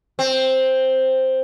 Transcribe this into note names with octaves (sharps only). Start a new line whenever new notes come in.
C4